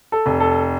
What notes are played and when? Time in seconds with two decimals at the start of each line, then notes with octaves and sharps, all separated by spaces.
0.12 A4
0.26 F1
0.40 A4